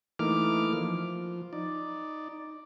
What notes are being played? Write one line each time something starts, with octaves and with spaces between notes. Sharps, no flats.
E3 A3 A#3 D#4 D6 F6
F3
D#4 D5